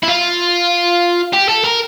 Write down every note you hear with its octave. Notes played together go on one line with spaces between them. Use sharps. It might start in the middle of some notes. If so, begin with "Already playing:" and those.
E4
F4
G4
A4
A#4